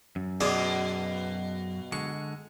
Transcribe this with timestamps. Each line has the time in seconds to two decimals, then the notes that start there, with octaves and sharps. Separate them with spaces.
0.16 F#2
0.40 B2 F4 G#4 D5
1.92 D3 G#3 C#6